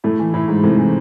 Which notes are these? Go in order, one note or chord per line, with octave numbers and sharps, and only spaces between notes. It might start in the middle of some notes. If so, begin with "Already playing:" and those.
A2 A3
E3
A2 E4
G#2
A2 C3 A3
E3